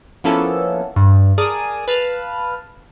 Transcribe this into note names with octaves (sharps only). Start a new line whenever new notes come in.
F3 A#3 B3 C#4 E4 A4
G2
G#4 A#4 D5 G#5 A5 D#6
B4 F5 A5 F6